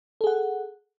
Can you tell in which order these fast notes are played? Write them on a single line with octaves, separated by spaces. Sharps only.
A4 G#4 F#5